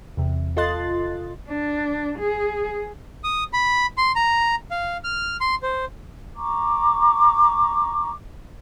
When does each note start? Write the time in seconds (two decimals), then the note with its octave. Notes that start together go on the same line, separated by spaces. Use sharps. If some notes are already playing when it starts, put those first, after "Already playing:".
0.17 E2 C3
0.57 F4 A4 D#5 C6 F#6 A6
1.49 D4
2.19 G#4
3.24 D#6
3.53 B5
3.98 C6
4.16 A#5
4.71 F5
5.04 F6
5.41 C6
5.63 C5
6.35 A#5 C#6 D6